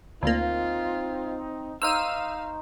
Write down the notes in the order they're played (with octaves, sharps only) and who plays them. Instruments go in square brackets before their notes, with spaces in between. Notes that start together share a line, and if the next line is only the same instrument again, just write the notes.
[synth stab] D2 A#3 [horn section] C4 D#4 [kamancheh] F4
[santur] D#4 C5 C#6 [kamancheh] F5 [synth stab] E6 F6 D#7